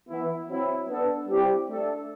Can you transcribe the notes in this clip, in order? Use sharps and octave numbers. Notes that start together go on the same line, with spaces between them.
E3 B3 E4
F#3 C4 E4
B3 D4 A4
G3 C4 E4 G4
A3 D4 A4